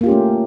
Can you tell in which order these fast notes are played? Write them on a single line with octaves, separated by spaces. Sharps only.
A#3 F4 G4 C#4 A3